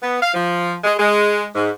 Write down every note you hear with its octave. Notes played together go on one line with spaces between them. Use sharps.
B3
F5
F3
G#3
G#3
G#2